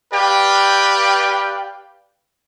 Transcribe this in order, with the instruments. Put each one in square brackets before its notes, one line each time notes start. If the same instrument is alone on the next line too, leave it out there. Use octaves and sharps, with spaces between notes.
[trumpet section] G4 B4 D5 F5 G5